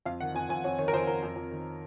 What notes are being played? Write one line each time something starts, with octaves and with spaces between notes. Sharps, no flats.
F2 F5
D#3 F#5
F2 G#5
F2 G#5
F2 C#5
D#3 C#5
A#4
F2 C5
F2 A#4
F2
F2
D#3